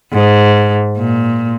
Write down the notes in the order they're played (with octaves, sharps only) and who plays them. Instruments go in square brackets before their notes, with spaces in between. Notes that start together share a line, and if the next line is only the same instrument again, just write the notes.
[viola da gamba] G#2
A#2